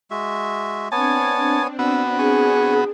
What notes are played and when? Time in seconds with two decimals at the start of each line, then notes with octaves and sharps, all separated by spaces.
0.11 G#3 F#4 E5
0.92 B3 C4 D4 C#5 G#5 A5
1.79 B3 F#4 E6
2.19 G#4 G#5 C#6